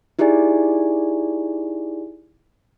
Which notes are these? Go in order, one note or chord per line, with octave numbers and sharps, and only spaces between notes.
D#4 E4 G4 G#4 D5 G#5